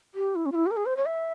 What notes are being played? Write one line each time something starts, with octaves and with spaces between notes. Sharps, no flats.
G4
E4
C#4
F4
E4
G4
A#4
G#4
C5
C#5
E5